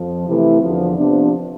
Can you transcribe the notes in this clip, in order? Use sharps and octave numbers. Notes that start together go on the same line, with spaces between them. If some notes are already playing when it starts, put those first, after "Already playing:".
Already playing: F2 F3
C3 E3 A3 E4 B4
E2 D3 F3
C3 F3 B3 D4